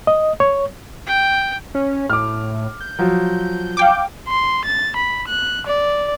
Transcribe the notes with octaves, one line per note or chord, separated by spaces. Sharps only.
D#5
C#5
G5
C#4
A2 D6 F6
G6
F3 F#3
F5 G5 D6
C6
A6
B5
F#6
D5